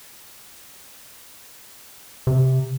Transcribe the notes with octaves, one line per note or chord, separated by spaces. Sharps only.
C3